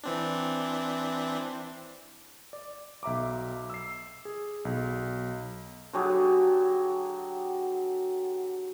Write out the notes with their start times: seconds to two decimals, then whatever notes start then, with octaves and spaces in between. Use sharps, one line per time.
0.04 E3 C4 D4
2.53 D5
3.03 B1 E5 A#5 D6
3.70 E6 C7
4.25 G#4
4.65 B1
5.93 D3 F#3 G4 G#4